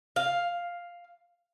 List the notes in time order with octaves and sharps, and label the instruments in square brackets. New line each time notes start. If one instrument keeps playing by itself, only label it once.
[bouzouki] F5